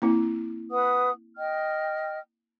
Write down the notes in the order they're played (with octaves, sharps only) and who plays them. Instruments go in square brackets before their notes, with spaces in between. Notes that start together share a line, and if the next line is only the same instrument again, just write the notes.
[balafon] A#3 C4 E4
[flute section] B4 F#5 D#6
D#5 G5 F6